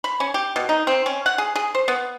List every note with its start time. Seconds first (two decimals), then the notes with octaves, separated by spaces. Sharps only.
0.04 B5
0.20 C#4
0.34 G4
0.56 B2
0.69 D#4
0.87 C4
1.06 C#4
1.26 F#5
1.38 G#4
1.56 G#4
1.75 C5
1.88 B3